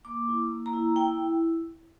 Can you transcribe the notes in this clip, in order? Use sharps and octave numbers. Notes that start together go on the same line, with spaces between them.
A#3 D6
E4
A#3
A#5
E4
E4 G5